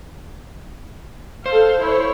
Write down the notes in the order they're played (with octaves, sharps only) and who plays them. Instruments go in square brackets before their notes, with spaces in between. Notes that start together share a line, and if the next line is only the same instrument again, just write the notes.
[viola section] A4 F5 [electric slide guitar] C5
[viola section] E4 C#5